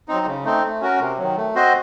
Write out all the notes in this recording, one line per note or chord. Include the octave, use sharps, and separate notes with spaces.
F#3 C4 D#4
C#3
A3 C4 D#4
A3
C#4 F#4 A#4
C3
D#3 F#3
A3
C4 F#4 C5 D#5